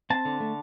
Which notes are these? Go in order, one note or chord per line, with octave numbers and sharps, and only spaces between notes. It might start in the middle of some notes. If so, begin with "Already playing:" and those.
C4 A5
D3
A3